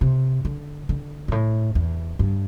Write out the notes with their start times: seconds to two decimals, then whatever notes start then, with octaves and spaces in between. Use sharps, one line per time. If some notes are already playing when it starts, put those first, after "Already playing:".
0.01 C3
0.45 D3
0.89 D3
1.28 G2
1.32 A2
1.75 E2
2.19 G2